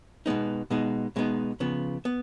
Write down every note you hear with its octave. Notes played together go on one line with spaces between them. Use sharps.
B2 G#3 B3 D#4
B2 G#3 B3 D#4
B2 G#3 B3 D#4
C#3 F3 B3
B3